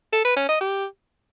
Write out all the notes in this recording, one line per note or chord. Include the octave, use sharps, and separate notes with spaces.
A4
B4
C#4
D#5
G4